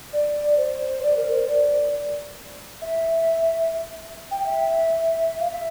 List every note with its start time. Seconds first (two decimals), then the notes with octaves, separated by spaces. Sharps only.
0.13 D5
0.57 C5
1.03 D5
1.17 A#4
1.32 C5
1.47 D5
2.82 E5
4.31 G5
4.46 E5
5.40 F5
5.51 E5